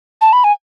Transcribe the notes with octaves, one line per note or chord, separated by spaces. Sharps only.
A5
B5
G#5